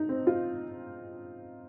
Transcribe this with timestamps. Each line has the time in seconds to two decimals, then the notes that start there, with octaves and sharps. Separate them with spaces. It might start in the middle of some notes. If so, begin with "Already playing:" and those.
Already playing: D#4
0.09 C4
0.27 F4